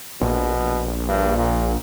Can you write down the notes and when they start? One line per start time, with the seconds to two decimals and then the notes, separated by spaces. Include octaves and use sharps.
0.21 A#1 B2
1.08 G2
1.38 A#2